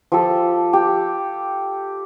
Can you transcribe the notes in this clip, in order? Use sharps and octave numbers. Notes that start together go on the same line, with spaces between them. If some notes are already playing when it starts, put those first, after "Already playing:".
F3 G4 A4
G4